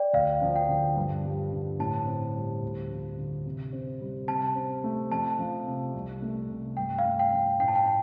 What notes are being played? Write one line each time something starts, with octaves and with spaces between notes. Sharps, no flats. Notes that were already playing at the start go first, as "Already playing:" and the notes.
Already playing: D5 G5
D2 F5
F3
G5
D3
G2
G3
D3
A2 A5
C4
G3
D2
F3
D3
C3
C4
G3
C3 A5
C4
A3
F2 A5
F3
C3
C2
A3
C3
G2 G5
F5
A3
G5
F3
A2 G5
A5
G5